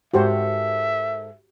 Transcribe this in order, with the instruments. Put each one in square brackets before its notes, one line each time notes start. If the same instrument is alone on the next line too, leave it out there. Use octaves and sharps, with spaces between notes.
[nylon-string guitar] G#2 A4 A#4 [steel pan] F#4 G4 C5 [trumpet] E5